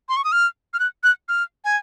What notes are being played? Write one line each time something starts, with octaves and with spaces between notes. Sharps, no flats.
C6
C#6
D#6
F6
F6
F#6
F#6
F6
G#5